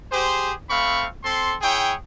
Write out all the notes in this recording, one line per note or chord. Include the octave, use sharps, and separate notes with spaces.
G4 G#4 C5
A3 C4 F5 B5 C#6
C4 A4 C6
E4 G#4 C#5 G5